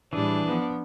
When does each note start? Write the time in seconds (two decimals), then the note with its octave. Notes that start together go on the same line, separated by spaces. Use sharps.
0.13 A2 E3 G3 D4 G#4
0.45 F3 B3